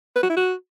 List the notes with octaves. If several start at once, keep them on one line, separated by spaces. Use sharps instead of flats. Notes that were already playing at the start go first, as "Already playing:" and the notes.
B4
F#4
E4
F#4